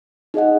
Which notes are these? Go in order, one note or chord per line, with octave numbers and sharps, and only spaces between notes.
D#4 G#4 D#5 F#5